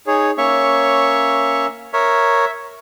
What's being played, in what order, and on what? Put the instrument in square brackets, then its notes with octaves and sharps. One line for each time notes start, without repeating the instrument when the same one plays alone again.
[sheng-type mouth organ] D#4 G#4 C#5
[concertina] A#3 C#4 E5 [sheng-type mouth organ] C#5 C#6
[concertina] A#4 C#5 [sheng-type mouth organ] E5